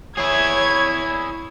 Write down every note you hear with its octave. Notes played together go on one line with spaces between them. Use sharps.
E4 G#4 C#5 G#6